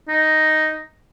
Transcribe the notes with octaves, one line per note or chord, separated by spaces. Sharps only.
D#4